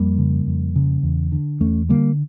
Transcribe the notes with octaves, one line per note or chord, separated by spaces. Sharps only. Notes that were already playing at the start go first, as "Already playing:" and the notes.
Already playing: F2 G3 A#3
C#3
F2
C#3
E2
D3
E2 A3 C#4
D3 G3 A#3